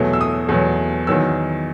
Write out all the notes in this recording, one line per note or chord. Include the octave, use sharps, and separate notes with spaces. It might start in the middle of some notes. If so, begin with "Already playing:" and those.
Already playing: E2 B2 F#3 A3
E6
D#6
E2 B2 F#3 A3
E2 D#3 F#3 E6